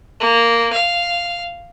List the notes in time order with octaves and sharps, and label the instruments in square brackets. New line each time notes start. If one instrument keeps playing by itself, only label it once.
[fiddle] A#3
F5